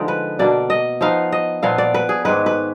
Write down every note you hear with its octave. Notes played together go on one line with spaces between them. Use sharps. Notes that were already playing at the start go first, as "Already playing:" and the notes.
Already playing: D3 F3 G#3 D#4 D5
B4
B2 A#3 D4 D5
D#5
F3 B3 D#4 F5
D#5
A#2 F3 B3 F5
D5
B4
G#4
G#2 D#3 G#3 B4
B4